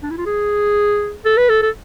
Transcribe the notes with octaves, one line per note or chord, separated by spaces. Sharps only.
D4
E4
F4
G#4
A4
B4
A4
A4